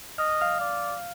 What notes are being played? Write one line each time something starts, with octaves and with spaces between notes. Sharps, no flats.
D#5 F6
F5 F6
D5